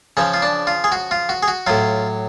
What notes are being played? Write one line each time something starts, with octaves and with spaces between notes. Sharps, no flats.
C#3 F3 C#4
F4
D4
F4
G#4
F#4
F4
F#4
G#4
F#4
A2 F#3 F4